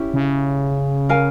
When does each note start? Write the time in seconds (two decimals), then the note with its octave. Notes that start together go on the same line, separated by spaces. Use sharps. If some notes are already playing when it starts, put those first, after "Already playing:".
Already playing: C#4 E4 G4
0.14 C#3
1.09 A#4 F5 G#5